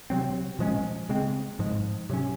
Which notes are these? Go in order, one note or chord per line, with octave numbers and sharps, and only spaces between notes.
C3 F#3 C4
A#2 F3 G#3 C#4
C#3 G#3 C4
G#2 F3 G#3
C3 F#3 C#4